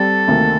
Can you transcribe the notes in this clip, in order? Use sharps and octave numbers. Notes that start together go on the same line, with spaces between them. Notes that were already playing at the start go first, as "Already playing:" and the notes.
Already playing: G3 C4 A4
D2 C3 D#3 A#3